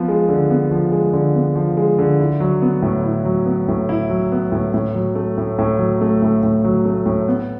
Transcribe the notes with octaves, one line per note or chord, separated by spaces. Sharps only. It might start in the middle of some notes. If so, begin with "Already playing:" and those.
Already playing: F3 B3
G#3
D3
B3
F3
G#3
D3
B3
F3
G#3
D3
E4
F#3
B3
A2
E4
F#3
B3
A2
E4
F#3
B3
A2
A2
F#3
A3
A2
A2
F#3
A3
A2
A2
F#3
A3
A2
B3